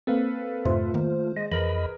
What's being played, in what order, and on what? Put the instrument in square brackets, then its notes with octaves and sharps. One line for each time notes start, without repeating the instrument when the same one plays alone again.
[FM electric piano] A#3 C4 [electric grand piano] A4 B4 F5
[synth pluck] F2 G#2 C3 [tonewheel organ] A3 F4 [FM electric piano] C5
[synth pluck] D#3 A#3
[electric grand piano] G#3 [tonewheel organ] D#5
[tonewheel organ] F2 D#5 B5 [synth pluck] E3 [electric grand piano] G#4 A#4 B4